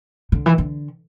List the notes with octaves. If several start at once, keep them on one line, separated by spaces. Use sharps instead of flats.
D3
E3
D3